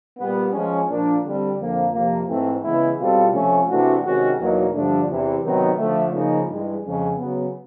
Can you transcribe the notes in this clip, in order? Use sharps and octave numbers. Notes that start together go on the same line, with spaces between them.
A#2 G3 B3
F3 G#3 C#4
A#2 F3 A#3 D4
D3 G3 C4
F2 D3 F3 A#3
F2 C3 F3 A#3
G#2 E3 A3 C4
C#3 E3 G#3 B3 E4
B2 G3 C4 F4 A4
C3 F3 A3 C#4
C3 E3 A3 D4 F#4
C3 D#3 G#3 C#4 F#4
E2 B2 F#3 A#3 D#4
G2 D3 F3 A3 D4
E2 C3 E3
C3 D#3 F#3 B3 D#4
D3 F3 A3
C#3 F3 A#3 D#4
G2 E3 G#3
F2 C#3 F3 G#3 C#4
C#3 F#3 B3